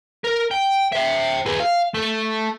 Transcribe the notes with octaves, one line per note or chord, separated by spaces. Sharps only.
A#4
G5
E5 G5
G#4 B4
F5
A3